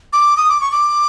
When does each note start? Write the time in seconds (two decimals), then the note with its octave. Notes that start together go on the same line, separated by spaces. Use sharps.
0.13 D6
0.37 D#6
0.49 D6
0.61 C#6
0.72 D6